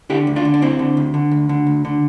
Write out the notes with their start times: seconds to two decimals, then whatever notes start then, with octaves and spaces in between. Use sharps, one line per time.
0.10 D3 E4 G4
0.27 D2
0.36 D4 F4
0.45 D3
0.54 D4
0.62 D2 C4 E4
0.79 D3
0.97 D2
1.14 D3
1.31 D2
1.49 D3
1.67 D2
1.85 D3